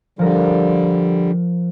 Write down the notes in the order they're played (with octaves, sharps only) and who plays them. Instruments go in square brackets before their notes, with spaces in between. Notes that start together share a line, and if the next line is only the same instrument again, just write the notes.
[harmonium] D3 G3 [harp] F3 A#4